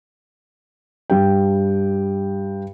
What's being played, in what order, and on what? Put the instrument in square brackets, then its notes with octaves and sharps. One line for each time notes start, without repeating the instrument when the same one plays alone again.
[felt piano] G2 G5